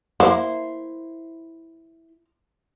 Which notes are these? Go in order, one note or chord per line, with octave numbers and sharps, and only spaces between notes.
A#3 E4 C5